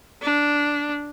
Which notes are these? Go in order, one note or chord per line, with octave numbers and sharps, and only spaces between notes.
D4